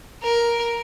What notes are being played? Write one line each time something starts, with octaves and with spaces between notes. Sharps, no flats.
A#4